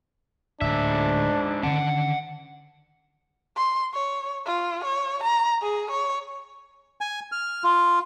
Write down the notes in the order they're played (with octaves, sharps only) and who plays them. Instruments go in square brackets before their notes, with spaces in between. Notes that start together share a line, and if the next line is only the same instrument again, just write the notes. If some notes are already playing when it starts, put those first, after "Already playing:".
[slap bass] D1 [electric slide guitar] G#2 E5 [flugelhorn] D4
[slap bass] D3 D#3 C#4 [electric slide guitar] F#5 A5
[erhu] C6
C#5
F4
C#5
A#5
G#4
C#5
[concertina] G#5
F6
F4